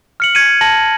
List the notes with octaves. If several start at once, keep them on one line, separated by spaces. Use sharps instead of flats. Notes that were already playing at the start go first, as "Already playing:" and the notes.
F6 C#7 F#7
G#6 C#7 D#7
A5 A#6 F#7